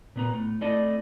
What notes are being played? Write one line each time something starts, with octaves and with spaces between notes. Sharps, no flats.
A#2 B3 A#5
A2
A3 C4 E4 D5 D#5 A5